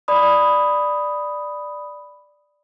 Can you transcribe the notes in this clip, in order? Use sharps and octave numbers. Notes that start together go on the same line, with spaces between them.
D5 B5 D#6